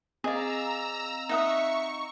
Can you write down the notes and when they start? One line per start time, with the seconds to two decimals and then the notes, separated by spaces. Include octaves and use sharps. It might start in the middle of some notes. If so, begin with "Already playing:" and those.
0.24 C4 G#4 D5 D#5 F5 A#5 E6
1.29 D#4 E5 F#5 C#6 D#6